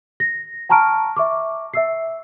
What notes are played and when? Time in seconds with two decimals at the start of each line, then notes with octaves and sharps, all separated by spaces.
0.20 A#6
0.69 G5 A5 A#5 C#6 F6 D7
1.16 E5 C#6 D6
1.74 E5 E6 C7